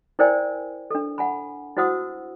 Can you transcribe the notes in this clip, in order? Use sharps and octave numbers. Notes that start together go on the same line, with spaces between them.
E4 A#4 C5 D5 G5 G#5
D4 A4
F#5 G#5 B5
E4 F#4 C5 F#5 D#6 E6